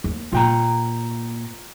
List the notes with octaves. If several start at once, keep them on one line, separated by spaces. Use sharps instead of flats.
D#2
A#2 F4 G5 A#5